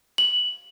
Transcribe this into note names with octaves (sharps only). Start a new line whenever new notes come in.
F#7